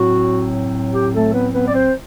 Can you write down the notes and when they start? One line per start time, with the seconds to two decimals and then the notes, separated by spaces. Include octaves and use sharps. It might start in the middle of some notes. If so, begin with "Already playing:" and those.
Already playing: A2 F#3 C4 F#4
0.94 G4
1.14 A3 A4
1.33 B3 B4
1.53 B3 B4
1.67 D5
1.73 C4 C5